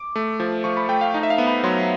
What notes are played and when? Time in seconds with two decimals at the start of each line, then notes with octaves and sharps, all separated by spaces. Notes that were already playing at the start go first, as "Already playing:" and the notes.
Already playing: D6
0.16 A3
0.40 F3
0.64 F3 C#6
0.77 B5
0.89 A3 G5
1.01 F5
1.14 D#4
1.23 E5
1.30 F5
1.38 B3
1.47 B5
1.64 F#3 C6